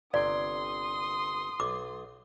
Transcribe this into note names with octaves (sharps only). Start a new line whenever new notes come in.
G1 C3 D5 G5 C6 D#6
B1 D6